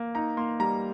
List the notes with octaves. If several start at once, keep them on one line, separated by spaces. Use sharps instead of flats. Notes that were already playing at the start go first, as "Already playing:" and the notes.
Already playing: A#3
D#4 A#5
A#3 C6
G3 A#5